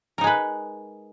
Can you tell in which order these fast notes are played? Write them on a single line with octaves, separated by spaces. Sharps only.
A#4 D#4 G#3 B4